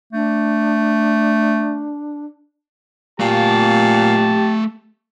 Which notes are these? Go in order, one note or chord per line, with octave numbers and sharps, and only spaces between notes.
A3 D4
A#2 A3 G4 F5 A5